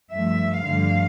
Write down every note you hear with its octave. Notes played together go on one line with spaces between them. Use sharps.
G2 F3 A3 E5
G2 D3 F3 A3 F5